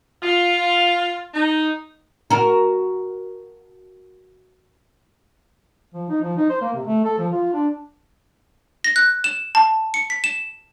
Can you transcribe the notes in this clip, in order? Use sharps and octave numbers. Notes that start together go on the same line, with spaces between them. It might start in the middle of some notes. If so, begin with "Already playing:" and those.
F4
D#4
F#4 A#4
F3
D#4
F3
D#4
C5
A#3
C3
A3
A4
F3
F4
D4
A#6
F#6
E7
A5
C#7
B6
E7